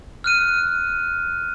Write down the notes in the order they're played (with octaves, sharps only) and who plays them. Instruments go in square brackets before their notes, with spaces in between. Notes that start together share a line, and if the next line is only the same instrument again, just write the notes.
[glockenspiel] F6 F#6 D#7